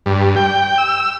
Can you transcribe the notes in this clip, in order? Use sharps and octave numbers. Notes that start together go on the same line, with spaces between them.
G2
G5
E6